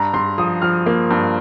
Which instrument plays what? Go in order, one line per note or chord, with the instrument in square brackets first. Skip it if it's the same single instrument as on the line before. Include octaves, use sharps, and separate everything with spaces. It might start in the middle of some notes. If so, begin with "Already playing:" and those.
Already playing: [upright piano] G2 A#5
G2 C6
F3 D#6
F3 F6
A#3
G2